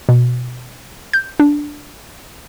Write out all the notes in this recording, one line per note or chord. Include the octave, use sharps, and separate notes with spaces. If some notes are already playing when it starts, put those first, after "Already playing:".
B2
G6
D4